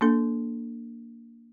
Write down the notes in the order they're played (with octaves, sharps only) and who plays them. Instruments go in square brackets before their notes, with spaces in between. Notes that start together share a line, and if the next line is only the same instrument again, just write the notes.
[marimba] A#3 D4 A4